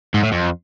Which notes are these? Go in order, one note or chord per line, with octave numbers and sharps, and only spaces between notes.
G#2
A2
F2